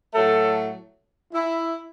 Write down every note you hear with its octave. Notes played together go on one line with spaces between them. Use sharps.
A2 F#3 A3 A4
E4